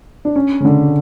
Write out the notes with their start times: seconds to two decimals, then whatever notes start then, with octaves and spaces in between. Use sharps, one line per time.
0.25 D4
0.36 C#4
0.61 C#3
0.65 D3